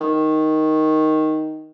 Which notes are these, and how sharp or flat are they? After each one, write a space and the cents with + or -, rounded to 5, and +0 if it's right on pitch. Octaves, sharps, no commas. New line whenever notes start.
D#3 +5